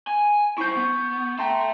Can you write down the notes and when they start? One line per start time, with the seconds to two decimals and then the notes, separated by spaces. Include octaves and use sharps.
0.07 G#5
0.58 E4 C5 C#6 G6
0.77 B3
1.39 E5 G5 A5 A#5 C6